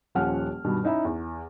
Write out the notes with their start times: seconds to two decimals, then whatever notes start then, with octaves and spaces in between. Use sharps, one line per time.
0.15 D#1 F3 C#4 F#5 F6
0.64 G2 B2 D#3 G3
0.84 C#4 D#4 E4 E5
1.05 E2